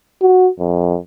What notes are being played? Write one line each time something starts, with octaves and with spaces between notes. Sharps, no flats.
F#4
F2